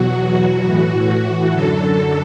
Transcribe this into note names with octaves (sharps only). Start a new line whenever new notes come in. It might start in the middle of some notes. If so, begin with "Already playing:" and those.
Already playing: E2 B2 F#3 F#4
A2 E3
F#2 D3 F#3 A4